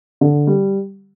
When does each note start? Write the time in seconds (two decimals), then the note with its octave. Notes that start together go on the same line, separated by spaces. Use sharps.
0.21 D3
0.47 G3